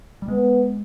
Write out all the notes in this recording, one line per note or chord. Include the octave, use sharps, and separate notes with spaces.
G3
G#3 B3